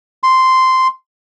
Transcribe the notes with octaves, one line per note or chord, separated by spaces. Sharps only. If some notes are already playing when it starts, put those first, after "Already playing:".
C6